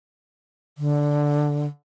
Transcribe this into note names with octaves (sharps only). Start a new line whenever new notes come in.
D3